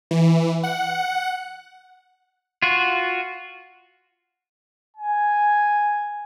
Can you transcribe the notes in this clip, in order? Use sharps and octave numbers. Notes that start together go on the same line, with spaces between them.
E3
F#5
F4 F#4
G#5